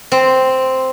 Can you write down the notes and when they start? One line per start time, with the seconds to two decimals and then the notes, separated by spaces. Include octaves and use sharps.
0.12 C4